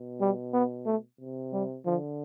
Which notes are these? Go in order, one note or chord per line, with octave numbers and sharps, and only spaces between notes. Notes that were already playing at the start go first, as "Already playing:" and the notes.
Already playing: B2
G3
B3
A3
C3
G3
D3 F3